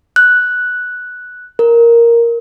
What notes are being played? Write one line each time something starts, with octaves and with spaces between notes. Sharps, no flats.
F#6
A#4